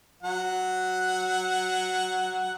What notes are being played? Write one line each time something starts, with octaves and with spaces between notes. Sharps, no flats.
F#3 F#5